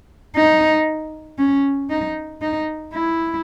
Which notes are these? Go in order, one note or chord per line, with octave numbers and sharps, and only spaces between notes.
D#4
C#4
D#4
D#4
E4